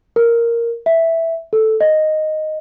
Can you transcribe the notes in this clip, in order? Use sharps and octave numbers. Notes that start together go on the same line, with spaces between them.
A#4
E5
A4
D#5